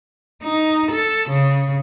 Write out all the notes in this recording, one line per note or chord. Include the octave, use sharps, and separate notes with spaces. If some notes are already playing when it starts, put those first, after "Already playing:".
D#4
A4
C#3